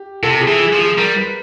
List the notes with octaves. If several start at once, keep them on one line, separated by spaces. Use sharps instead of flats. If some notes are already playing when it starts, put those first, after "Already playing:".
Already playing: G4
C3 A4
G#4
E3
G#4
F3
G#4
G3 A#4
B4